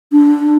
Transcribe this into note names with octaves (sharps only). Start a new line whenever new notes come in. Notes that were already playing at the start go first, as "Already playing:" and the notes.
D4